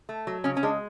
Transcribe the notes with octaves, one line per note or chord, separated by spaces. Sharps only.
A3
F#3
C#3 C#4
C#4
G#3 D4